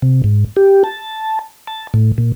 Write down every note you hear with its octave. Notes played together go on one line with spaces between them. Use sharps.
C3
G#2
G4
A5
A5
A2
A#2